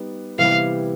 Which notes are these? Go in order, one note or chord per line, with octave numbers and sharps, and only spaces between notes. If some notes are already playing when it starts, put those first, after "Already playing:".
Already playing: G3 B3 D#4
C3 E3 G3 B3 E4 F5